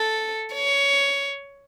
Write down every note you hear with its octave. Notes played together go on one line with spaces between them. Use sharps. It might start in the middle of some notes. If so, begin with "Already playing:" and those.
Already playing: A4
C#5